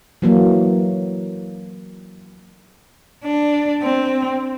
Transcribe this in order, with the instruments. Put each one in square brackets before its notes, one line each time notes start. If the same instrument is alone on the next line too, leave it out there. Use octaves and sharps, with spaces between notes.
[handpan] E3 F#3 A#3
[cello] D4
C4